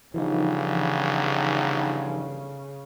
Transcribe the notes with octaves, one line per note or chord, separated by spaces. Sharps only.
G1 C#3 E3 F3 D#4